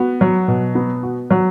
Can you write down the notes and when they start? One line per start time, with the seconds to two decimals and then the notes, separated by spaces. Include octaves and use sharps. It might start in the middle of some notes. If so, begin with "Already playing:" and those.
Already playing: B3 F#4
0.21 F#3
0.48 B2
0.75 B3
1.03 F#4
1.31 F#3